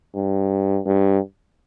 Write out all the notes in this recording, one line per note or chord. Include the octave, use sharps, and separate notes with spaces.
G2
G2